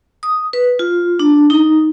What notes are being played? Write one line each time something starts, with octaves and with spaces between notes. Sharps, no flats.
D#6
B4
F4
D4
D#4